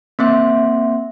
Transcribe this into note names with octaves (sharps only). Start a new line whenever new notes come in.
A#3 C4 E5 C6